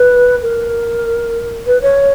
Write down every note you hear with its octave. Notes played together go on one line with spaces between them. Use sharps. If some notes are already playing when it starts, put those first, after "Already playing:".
Already playing: B4
A#4
B4
C#5